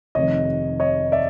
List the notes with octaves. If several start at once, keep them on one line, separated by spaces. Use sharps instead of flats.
F1 F2 C3 D#3 C#5 D#5
C#5 D#5
D5 E5